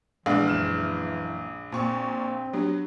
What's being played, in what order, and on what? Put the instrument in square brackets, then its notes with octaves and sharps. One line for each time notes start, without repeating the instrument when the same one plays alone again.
[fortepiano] A#1 [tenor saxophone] E3 [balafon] G#3 G#4 [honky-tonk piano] B3 D4 F5
[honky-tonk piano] F#1 F6 E7
[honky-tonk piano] A#2 C#6 [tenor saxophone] C4
[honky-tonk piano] F#3 [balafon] B3 D4 G4